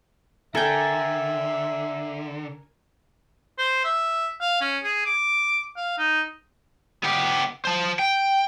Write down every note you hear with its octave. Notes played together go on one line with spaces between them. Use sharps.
D3 A4 A#4 E5 G5 G#5
C5
E5
F5
C#4
G#4
D6
F5
D#4
B3 G4
C5 A5
G5